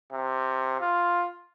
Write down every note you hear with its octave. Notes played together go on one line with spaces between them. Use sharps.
C3
F4